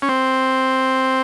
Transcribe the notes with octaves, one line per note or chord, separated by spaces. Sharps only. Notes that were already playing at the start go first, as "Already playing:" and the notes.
C#4
C4